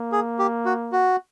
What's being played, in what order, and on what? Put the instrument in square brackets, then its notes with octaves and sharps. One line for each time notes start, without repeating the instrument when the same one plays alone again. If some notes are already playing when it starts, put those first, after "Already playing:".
Already playing: [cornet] A#3
[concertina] G#4
G4
F#4
F#4